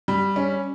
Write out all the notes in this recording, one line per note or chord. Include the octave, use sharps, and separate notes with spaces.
G3
C#4